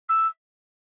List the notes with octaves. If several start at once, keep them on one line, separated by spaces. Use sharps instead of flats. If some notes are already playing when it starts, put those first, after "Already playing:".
E6